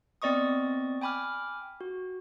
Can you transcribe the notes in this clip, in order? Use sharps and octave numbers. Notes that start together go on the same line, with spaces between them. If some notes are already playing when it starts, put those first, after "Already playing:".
B3 C4 D5 D#5 C#6 D#6
G5 G#5 B5 D6 F6
F#4